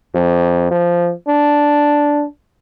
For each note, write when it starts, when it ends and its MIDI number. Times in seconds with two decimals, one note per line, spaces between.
0.15 0.67 41
0.71 1.12 53
1.28 2.25 62